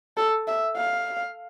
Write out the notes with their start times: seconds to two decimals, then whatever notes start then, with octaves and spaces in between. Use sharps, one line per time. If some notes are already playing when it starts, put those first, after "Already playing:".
0.17 A4
0.47 E5
0.76 F5